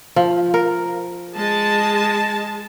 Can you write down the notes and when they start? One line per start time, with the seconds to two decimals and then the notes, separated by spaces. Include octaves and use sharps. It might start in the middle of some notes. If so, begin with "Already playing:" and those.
0.16 F3
0.54 A#4
1.36 G#3 A5